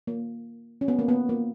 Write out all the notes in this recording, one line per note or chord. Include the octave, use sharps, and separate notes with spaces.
A#3
C#4
B3
A#3
B3
A#3